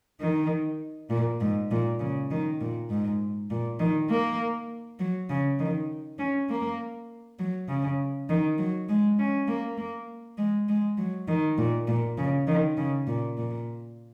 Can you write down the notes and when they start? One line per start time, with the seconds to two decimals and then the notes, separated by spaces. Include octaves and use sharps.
0.21 D#3
1.10 A#2
1.41 G#2
1.71 A#2
2.00 C#3
2.31 D#3
2.61 A#2
2.90 G#2
3.51 A#2
3.80 D#3
4.10 A#3
5.00 F#3
5.30 C#3
5.60 D#3
6.19 C#4
6.50 A#3
7.39 F#3
7.69 C#3
8.29 D#3
8.59 F#3
8.89 G#3
9.19 C#4
9.48 A#3
9.78 A#3
10.38 G#3
10.69 G#3
10.98 F#3
11.28 D#3
11.58 A#2
11.88 A#2
12.18 C#3
12.47 D#3
12.77 C#3
13.07 A#2
13.38 A#2